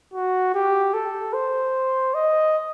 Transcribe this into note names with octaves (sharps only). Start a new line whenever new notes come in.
F#4
G4
A4
C5
D#5